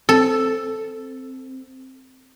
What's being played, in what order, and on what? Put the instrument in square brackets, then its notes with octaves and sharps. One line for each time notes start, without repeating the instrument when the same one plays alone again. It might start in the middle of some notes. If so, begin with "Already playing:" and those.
[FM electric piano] C4 [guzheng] A4